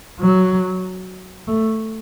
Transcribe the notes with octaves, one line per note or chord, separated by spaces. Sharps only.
F#3
A3